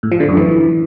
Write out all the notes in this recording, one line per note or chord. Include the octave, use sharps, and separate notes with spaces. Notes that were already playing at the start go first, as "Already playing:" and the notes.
A2
F3
D3
F#2
E3